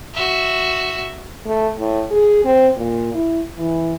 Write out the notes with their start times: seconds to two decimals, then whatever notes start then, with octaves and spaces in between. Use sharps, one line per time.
0.14 F#4 E5
1.46 A3
1.79 A2
2.11 G#4
2.45 C4
2.77 A#2
3.14 E4
3.58 E3